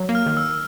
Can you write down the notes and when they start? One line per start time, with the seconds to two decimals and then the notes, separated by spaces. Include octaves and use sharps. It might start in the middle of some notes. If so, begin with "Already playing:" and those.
Already playing: F#3
0.09 A#3
0.15 F6
0.26 D#3
0.37 E6